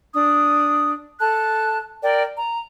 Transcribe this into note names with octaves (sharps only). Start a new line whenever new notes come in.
D4 D#6
A4 A5 F#6
A#4 D5 G5
A#5